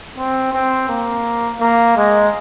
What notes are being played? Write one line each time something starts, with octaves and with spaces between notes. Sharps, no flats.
C4
C4
A#3
A#3
G#3